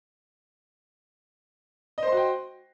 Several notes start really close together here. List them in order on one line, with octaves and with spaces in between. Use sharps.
D#5 C5 C6 F#4 G5